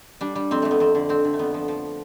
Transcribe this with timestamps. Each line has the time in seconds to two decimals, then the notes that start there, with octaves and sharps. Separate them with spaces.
0.21 G3 D4
0.35 G3
0.51 F2 C4
0.62 F2 A3
0.71 B3
0.80 F2 C4
0.95 D3
1.09 F2 C4
1.25 D3
1.34 A3
1.39 F2 B3
1.54 F3
1.68 F3